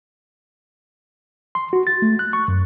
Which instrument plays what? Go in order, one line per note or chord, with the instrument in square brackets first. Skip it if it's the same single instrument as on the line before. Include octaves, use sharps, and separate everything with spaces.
[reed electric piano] C6
F#4
A6
A3
F#6
C#6
F#2